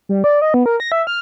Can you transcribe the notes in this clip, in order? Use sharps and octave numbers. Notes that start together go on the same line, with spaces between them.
G3
D5
D#5
B3
A#4
A#6
E5
F6